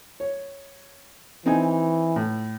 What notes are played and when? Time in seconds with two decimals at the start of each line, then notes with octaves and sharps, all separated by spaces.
0.20 C#5
1.46 E3 C4 D#4 G#5
2.16 A2